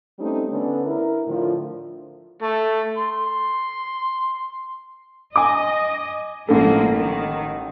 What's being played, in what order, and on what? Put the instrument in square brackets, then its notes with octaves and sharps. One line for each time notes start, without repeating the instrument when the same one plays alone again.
[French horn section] G3 A3 C4 C#4 D#4
D3 B3 C#4 D4
E4 A#4
A2 D3 F3
[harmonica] A3
C6
[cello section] D#5 [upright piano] G#5 D6
[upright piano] A1 A4 [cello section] F3 G#3 A#3
[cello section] D#3